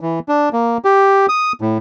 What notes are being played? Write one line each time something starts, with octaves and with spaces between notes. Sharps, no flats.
E3
D4
A#3
G4
D#6
A2